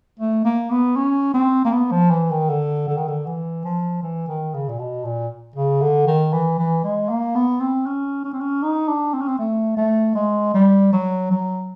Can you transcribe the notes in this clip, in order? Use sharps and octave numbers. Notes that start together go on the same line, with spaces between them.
A3
A#3
B3
C#4
C4
A#3
B3
F3
E3
D#3
D3
D3
D#3
D3
E3
F3
E3
D#3
C#3
A#2
B2
A#2
C#3
D3
D#3
E3
E3
G#3
A#3
B3
C4
C#4
C#4
C4
C#4
D#4
D4
C4
C#4
C4
A3
A3
G#3
G3
F#3
F#3